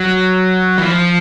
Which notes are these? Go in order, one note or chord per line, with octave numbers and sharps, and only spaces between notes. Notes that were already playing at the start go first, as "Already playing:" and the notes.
Already playing: F#3
E3
F3